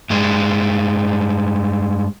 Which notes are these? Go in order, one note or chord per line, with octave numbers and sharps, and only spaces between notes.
G2 G3 G#3